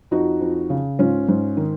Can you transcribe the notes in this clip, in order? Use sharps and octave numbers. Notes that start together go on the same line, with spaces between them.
F2 D#4 F#4
F2
C#3
G#2 C#4 F4
G#2
D#3